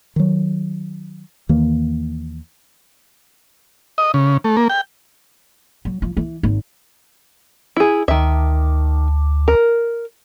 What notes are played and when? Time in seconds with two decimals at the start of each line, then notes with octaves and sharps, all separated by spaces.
0.16 D#3 F#3
1.49 D#2 D#3 E3 A#3
3.98 D#5
4.14 C#3
4.44 A3
4.57 A#3
4.69 G5
5.85 F#3
6.02 F3
6.17 E3
6.43 G#1
7.77 E4 G#4
8.08 D2 D#3 E5
9.48 A#4